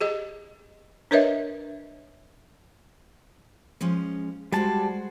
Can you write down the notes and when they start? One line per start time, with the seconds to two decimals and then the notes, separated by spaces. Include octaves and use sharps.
0.01 G4 G#4 D#5
1.11 D4 A#4 B4 C#5 D#5 E5
3.81 F3 G#3 C#4
4.52 G3 G#3 F#4 C5 A5